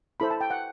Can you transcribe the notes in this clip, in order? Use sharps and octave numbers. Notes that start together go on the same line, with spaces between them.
E4 A4 C5 B5
A5
G5
F#5